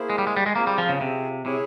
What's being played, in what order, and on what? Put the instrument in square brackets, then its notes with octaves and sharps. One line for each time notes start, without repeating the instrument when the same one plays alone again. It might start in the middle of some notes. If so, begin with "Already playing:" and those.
Already playing: [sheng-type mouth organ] A#3 E4 G#4 C5
[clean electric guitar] G#3
G3
G#3
G3
G#3
[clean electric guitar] A#3 [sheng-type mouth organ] C4 F4 G#4
[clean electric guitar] G3
F3
C#3
C3
[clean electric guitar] C3 [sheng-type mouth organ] E4 G#4 C#5